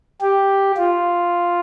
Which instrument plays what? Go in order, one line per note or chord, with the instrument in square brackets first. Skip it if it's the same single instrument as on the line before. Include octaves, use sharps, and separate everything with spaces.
[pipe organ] G4
F4